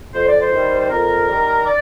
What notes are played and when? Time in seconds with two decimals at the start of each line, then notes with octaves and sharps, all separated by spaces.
0.14 F2 C5
0.26 D5
0.39 C5
0.51 D#3 G3
0.80 C5
0.89 F2 A#4
1.27 D#3 G3
1.65 D5